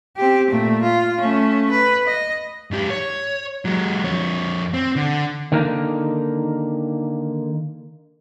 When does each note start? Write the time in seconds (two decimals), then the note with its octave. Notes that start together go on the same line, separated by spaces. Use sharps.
0.17 C4 G4
0.50 A#2 A3
0.82 F4
1.21 A3 C#4
1.71 B4
2.06 D#5
2.71 G#2 G4
2.90 C#5
3.65 F#3 G#3
4.04 F2 C#5
4.74 C4
4.96 D3
5.52 D3 D#3 A#3 D#4